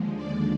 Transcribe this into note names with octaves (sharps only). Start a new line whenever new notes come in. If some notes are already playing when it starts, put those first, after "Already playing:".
Already playing: D#2 D3 F3 G#3
D5